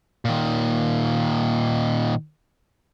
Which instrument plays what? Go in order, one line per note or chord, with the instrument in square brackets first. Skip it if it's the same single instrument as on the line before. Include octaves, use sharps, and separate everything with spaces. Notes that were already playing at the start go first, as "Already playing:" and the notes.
[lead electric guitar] A#2 D#3